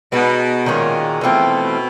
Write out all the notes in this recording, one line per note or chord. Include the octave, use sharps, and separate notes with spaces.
B2 G#3 B3 D#4
A#2 D#3 G#3 C#4 F#4
B2 E3 A3 C4 F4